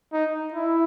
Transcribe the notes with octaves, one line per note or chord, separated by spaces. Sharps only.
D#4
E4